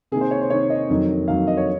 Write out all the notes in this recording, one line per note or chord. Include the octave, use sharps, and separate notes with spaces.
C3 D#3 A#3 G#4
C5
C#5
C5
C3 D#3 A#3 C#5
D#5
F2 D#3 F#3 A#3
F2 D#3 F#3 A#3 F5
D#5
C#5